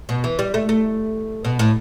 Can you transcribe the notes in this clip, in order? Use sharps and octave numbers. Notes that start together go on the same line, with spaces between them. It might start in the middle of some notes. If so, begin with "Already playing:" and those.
B2
E3
G3
A3
A3
B2
A2